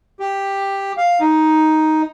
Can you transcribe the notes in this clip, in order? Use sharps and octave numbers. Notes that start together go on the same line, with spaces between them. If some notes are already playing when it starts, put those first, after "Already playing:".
G4
F5
D#4